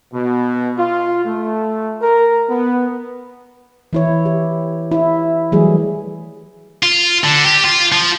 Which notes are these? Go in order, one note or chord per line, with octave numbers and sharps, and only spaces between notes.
B2
F4
A3
A#4
B3
E3 E4 C#5
G4
E4 E5
E3 F#3 G3 A3 G#4
F4
D3
G4
F4
F3